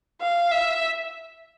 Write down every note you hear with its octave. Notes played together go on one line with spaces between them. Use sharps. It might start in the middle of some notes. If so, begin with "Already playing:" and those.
F5
E5